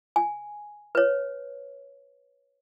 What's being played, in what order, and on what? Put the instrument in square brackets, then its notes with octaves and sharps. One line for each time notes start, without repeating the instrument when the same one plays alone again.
[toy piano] G#5
B4 C#5